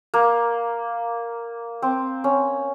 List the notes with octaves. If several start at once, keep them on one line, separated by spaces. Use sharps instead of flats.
A#3
C4
C#4